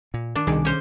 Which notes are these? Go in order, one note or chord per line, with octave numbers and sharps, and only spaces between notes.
A#2
D#3 D4
C2 B2 D#3 G#4 D6
C#4 C5